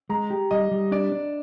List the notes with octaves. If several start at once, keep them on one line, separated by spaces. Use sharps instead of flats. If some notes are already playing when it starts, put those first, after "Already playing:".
G#3 A#5
G4
G3 D#5
G3
D4 D5
D4